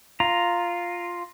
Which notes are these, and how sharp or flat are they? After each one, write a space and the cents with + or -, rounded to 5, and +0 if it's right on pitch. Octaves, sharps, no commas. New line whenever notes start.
F4 +0 A#5 +0